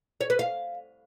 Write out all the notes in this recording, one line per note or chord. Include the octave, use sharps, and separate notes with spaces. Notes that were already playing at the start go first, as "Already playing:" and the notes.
C#5
B4
F5